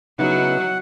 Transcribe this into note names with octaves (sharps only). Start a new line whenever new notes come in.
C#3 F#3 B3 D#4 E4 F#5